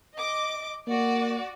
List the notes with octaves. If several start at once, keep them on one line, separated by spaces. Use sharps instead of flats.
D#5 D6
A#3 F#4 D5